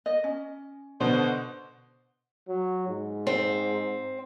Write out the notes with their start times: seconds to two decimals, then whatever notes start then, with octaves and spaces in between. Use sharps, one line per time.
0.06 D#5
0.24 C#4
1.00 B2 D3 C5
2.48 F#3
2.87 G#2
3.27 C4